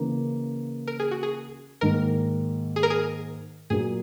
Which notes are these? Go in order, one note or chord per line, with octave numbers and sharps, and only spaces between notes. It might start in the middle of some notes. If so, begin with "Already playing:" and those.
Already playing: C#3 E3 A#3
A#4
G#4
F#4
G#4
G#2 D#3 A#3 A#4
G#4
A#4
G#4
A#2 F#3 A#3 G#4